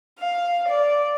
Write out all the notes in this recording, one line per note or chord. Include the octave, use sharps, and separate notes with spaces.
F5
D5